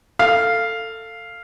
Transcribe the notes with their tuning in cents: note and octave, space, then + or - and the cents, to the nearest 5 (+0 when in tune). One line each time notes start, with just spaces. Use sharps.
A4 +20 F5 -5